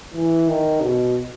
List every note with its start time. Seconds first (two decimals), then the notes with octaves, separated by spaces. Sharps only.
0.14 E3
0.48 D#3
0.81 B2